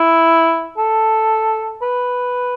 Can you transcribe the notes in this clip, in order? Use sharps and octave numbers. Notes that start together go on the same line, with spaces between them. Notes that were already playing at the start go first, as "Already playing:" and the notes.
Already playing: E4
A4
B4